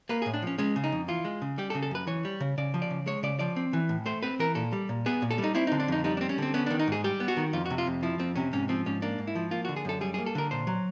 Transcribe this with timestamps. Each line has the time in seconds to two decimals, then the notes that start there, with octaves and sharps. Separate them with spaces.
0.09 A#3 B4
0.22 G#4
0.26 A2
0.34 D4
0.42 F3 C#4
0.58 G#3 C#4
0.76 C#3
0.84 D#4
0.92 F2
1.08 E3 F4
1.25 G#3
1.42 C#3
1.58 G3 G4
1.70 A4
1.75 C#3
1.83 A4
1.91 F#2 B4
2.07 E3 C#5
2.25 G3
2.40 C#3
2.58 C#3 D5
2.74 F3
2.82 D5
2.90 C#3
3.06 G#3 C#5
3.23 C#3 D5
3.39 F3 D5
3.56 C4
3.73 E3
3.89 A2
4.06 A3 C5
4.23 C4 B4
4.39 E3 A#4
4.55 A#2 A4
4.73 G3
4.89 A#2
5.06 B3 G#4
5.22 A#2
5.31 A4
5.38 G3
5.43 D#4
5.55 C4 E4
5.67 D#4
5.72 D3
5.80 D4
5.88 F2 D#4
6.04 G3 D#4
6.17 D4
6.21 C4
6.29 C#4
6.38 D3 C4
6.54 B3 C#4
6.66 D4
6.70 D#3
6.79 D#4
6.88 G#2 G#4
7.04 G3 G4
7.20 B3
7.28 F#4
7.37 D#3
7.53 F2 F4
7.66 F#4
7.70 C3
7.78 F4
7.87 F2
8.03 F3 E4
8.19 F2 C4
8.36 C3 C#4
8.53 G#2 C#4
8.69 F3 C4
8.86 G#2 C#4
9.02 A#3 D4
9.18 G#2
9.27 E4
9.35 F3
9.51 A#3 F4
9.65 F#4
9.69 D3
9.76 G#4
9.85 F#2 A4
10.01 G3 G#4
10.14 G#4
10.18 A#3
10.26 A4
10.35 D3 A#4
10.51 A#2 C5
10.67 F#3